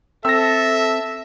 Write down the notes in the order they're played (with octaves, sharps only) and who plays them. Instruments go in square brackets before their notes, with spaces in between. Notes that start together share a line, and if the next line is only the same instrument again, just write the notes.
[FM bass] C4 [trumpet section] A4 [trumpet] E5 [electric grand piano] E6 A#6